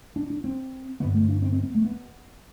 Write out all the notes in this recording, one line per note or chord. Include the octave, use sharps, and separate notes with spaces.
D4
D4
C4
G2 D3 B3
A3
D4
C4
C4
B3
A3
B3